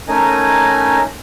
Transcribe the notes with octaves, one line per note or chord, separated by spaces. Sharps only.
A3 C#4 D#4 A#4 D#5 G#5